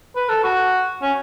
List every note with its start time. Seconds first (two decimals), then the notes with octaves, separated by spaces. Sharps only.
0.16 B4
0.29 A4
0.44 F#4
1.02 C#4